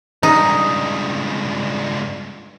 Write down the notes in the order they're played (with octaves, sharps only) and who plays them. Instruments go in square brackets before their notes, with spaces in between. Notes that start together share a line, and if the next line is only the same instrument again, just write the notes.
[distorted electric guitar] C#2 G2 [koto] D#4